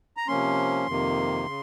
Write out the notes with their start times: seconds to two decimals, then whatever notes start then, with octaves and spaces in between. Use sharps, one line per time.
0.17 A#5
0.28 C3 F3 A#3 C#4 C6
0.87 F2 C3 D#3 A#3
1.46 C#3